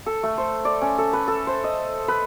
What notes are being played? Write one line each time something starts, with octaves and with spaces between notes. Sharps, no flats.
A4
A3
C5
D5
C#4
A4
B4
A4
C5
D#5
B4